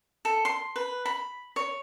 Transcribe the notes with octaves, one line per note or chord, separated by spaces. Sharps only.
A4
C6
B4
B5
C#5